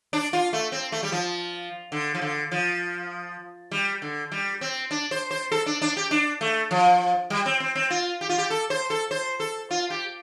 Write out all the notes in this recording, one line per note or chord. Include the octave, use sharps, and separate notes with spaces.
D4
F4
A3
C4
A3
G3
F3
D3
F3
D3
F3
G3
D3
G3
C4
D4
C5
C5
A4
D4
D4
G4
D4
A3
F3
G3
C4
C4
C4
F4
G4
F4
G4
A4
C5
A4
C5
A4
F4
G4